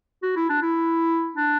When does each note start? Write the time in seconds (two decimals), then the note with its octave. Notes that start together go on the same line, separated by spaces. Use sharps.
0.23 F#4
0.36 E4
0.49 D4
0.62 E4
1.36 D4